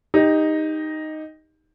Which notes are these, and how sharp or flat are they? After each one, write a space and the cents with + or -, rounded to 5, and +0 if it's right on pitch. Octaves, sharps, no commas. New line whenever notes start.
D#4 +0 G4 +20